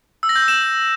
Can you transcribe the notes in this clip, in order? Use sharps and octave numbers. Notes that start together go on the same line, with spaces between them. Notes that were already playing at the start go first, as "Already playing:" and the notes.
E6
A#6
G6
E6
E7